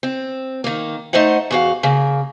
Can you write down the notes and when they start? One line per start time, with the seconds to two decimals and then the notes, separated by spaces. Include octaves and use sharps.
0.03 C4
0.64 D#3 A#3
1.13 A3 D#4 C5 D#5 F#5
1.51 E2 F#4 F5
1.83 C#3 A#3